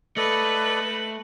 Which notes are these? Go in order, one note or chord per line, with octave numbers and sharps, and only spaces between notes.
A3 A4 B4 D5 D#5 F#7